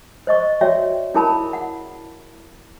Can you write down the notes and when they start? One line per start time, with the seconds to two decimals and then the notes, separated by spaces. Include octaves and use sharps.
0.27 C5 D#5 C#6
0.61 F#4 C#5 D5 E5 G5
1.14 C#4 E4 G#4 A#4 A5 B5
1.53 F#5